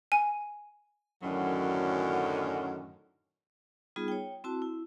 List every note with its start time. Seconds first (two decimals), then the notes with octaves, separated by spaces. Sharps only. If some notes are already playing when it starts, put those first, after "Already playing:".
0.12 G#5
1.23 F#2 A2 D3 D#3 F#3 C#4
3.96 G3 B3 D#4 F4 G#4
4.08 C#5 G5
4.44 C4 E4 F#4 A5
4.62 E4